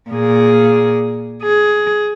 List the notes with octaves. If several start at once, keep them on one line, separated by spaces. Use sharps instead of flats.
A#2 G#4
G#4